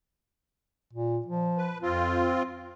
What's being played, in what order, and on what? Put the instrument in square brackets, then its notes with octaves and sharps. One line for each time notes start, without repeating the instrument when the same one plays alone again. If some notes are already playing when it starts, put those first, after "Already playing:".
[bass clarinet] A#2
F3
[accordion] B4
[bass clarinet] F2 [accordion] C4 F4